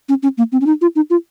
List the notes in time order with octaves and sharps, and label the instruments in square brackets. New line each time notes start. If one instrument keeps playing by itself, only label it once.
[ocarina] C#4
C#4
A#3
C4
C#4
D#4
F4
D#4
F4